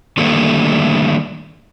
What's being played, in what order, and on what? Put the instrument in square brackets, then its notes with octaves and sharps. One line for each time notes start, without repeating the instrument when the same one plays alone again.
[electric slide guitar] D3 D#3 G3 A3 A#3